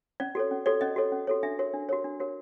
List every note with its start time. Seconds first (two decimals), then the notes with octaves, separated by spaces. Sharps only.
0.20 C#4 D5
0.35 F#4 A4 C#5
0.51 C#4
0.66 F#4 A4 C#5 D5
0.81 C#4 D#5
0.96 F#4 A4 C#5
1.12 C#4
1.27 F#4 A4 C#5
1.43 D4 E5
1.59 F#4 A#4 C#5
1.74 D4
1.89 F#4 A#4 C#5
2.04 D4
2.20 F#4 A#4 C#5